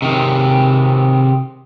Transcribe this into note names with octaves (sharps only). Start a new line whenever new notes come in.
C3 D#3